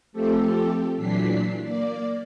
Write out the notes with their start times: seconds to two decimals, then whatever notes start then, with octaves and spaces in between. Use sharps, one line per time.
0.13 F3 A3 C4 G4 A4
0.96 A#2 E3 F#3 D4 B6 C7
1.61 A#3 D5